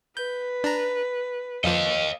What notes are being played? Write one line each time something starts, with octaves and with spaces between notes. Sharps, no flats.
B4 G6
D4 A#5
F2 F3 D#5 F5